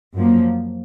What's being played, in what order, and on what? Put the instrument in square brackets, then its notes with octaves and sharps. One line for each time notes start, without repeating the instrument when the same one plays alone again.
[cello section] F#2 F3 A#3